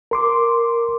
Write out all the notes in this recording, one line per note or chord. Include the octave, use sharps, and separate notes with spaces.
A#4 C6 D6